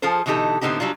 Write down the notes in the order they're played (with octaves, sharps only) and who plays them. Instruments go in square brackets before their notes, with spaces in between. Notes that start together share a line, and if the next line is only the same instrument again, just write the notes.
[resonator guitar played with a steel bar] F3 F4 G#4 A4 C5
B2 D3 E3 D#4 G4 A4
A2 D3 B3 C4 D#4 G4
F#3 G3 D4 F4